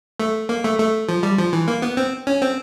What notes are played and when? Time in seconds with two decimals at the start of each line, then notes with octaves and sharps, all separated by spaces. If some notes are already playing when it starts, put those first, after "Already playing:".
0.20 A3
0.49 A#3
0.64 A3
0.79 A3
1.09 F3
1.23 G3
1.38 F3
1.53 E3
1.68 A#3
1.82 B3
1.97 C4
2.27 C#4
2.42 C4